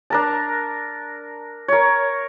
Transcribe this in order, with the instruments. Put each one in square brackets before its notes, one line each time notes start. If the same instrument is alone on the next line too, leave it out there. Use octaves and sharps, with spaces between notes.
[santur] D4 A#4 A5
A#4 C#5